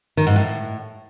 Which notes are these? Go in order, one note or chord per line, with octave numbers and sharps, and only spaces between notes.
D#3
G#2
A2